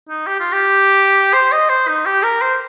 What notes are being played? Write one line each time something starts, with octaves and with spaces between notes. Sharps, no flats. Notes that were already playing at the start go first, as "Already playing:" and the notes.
D#4
G4
F4
G4
C5
D#5
C5
D#4
G4
A#4
C5